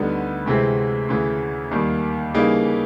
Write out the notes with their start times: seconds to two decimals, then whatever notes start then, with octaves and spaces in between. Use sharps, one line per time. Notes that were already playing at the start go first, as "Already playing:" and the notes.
Already playing: D2 D3 G3 B3 D#4
0.45 D2 C3 E3 G#3 C4
1.09 D2 C#3 E3
1.71 D#2 D#3 G3 A#3
2.34 C#3 E3 G3 A#3 D#4